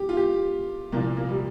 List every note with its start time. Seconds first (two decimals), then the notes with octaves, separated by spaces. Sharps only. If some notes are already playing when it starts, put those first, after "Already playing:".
Already playing: G4
0.09 F4
0.17 G4
0.92 C2 A#2 F3 A#3
1.17 A#3
1.29 G3